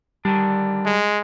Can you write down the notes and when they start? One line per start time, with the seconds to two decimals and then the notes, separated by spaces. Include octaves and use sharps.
0.25 D3 D#3 G3 D4
0.86 G#3